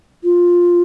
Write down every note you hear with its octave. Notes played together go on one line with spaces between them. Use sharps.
F4